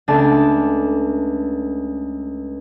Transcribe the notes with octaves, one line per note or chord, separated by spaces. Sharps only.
C#2 A3 D4 D5 A5